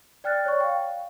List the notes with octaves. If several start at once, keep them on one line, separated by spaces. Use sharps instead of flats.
D5 G5 F6 F#6 A6
C#5 D5 C#6
F5 G5